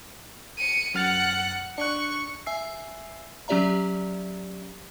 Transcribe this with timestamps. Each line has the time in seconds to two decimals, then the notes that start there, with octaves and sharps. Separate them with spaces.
0.58 C#7 D#7
0.94 F#2 F#5 F6 A6
1.78 D4 C#6 F#6
2.46 E5 G#5 E6 C7
3.48 F#3 C#4 G4 D5 E5 A#5